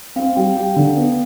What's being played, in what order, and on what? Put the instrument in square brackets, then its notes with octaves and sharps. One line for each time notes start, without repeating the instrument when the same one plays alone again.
[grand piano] C4 [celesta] F5
[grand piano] G3 [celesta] G5
[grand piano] G4 [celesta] G5
[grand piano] D3
B3